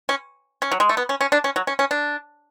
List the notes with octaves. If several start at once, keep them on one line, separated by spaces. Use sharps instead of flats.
C#4
C#4
F#3
G#3
A3
B3
C#4
C#4
D4
C#4
F#3
C#4
C#4
D4